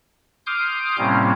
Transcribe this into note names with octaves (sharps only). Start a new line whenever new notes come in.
C6 D6 D#6 F6 G6
A2 C3 G3 A#3 C4 C#4